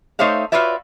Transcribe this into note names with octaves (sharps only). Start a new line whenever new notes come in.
A3 D#4 C5 C#5 E5 F5
F4 F#4 B4 C#5 D5 E5